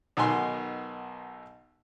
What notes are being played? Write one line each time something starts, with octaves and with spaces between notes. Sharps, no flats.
B1 B2 D#3 G#5 C6